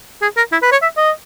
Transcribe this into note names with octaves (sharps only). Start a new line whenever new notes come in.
G#4
A#4
E4
B4
C#5
E5
D#5